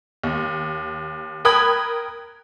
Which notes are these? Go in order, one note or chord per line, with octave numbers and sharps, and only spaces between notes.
D#2
A#4 G5 B5 D#6 F#6 G#6